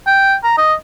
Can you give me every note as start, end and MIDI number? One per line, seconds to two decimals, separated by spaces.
0.07 0.35 79
0.44 0.55 82
0.58 0.74 75